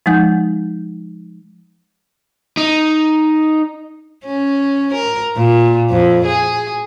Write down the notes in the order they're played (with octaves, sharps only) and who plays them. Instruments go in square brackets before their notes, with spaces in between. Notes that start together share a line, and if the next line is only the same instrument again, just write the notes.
[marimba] F3 G#3 D#4 F#5 G6
[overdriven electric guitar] D#4
[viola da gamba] C#4
A#4
A#2
F2
G#4